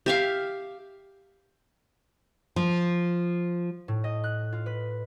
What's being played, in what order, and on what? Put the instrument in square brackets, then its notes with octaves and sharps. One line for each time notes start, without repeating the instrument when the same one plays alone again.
[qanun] G4 E5 F5
[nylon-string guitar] F3
[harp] A2
D#5
F#6
F4
B4